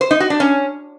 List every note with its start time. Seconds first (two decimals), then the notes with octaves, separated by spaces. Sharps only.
0.01 C5
0.11 D#4
0.20 F#4
0.30 D4
0.40 C#4